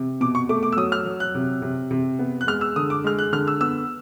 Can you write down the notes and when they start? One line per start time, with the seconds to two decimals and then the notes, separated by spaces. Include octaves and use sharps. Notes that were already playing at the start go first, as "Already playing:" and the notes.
Already playing: C3
0.21 B2 D6
0.35 C#6
0.49 A3 D6
0.63 D6
0.72 E6
0.77 F#3 D#6
0.92 F6
1.06 F#3
1.20 F#6
1.35 C3
1.62 C3
1.91 C3
2.19 B3
2.41 F#6
2.47 G#3 F6
2.61 E6
2.76 D3 D#6
2.90 D6
3.04 G#3 F6
3.19 F#6
3.33 D3 F6
3.47 E6
3.61 B3 E6